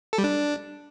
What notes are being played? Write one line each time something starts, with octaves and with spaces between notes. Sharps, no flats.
A4
G3
D4